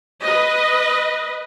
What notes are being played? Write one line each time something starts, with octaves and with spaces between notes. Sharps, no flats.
B4 D#5